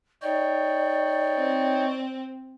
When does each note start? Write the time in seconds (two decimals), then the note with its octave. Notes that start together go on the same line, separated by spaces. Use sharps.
0.22 D#4 C#5 D5 G5
1.36 C4